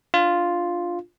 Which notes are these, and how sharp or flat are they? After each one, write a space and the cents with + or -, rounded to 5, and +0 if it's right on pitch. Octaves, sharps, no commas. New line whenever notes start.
D4 +10 F4 +0